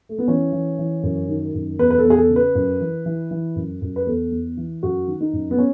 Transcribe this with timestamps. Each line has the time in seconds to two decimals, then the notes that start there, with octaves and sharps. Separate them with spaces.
0.09 A3
0.19 B3
0.28 E3 C#4
0.52 E3
0.79 E3
1.03 F#2
1.29 D#3
1.54 F#2
1.79 E2 B4
1.91 B4
1.98 A4
2.04 E2
2.10 G#4
2.17 A4
2.30 C#3
2.36 B4
2.55 F#2
2.80 E3
3.06 E3
3.31 E3
3.56 F#2
3.81 F#2
3.96 B4
4.06 E2 A4
4.32 E2
4.57 E3
4.83 F#2 F#4
5.08 D#3
5.21 D#4
5.33 F#2
5.51 B3
5.58 C#4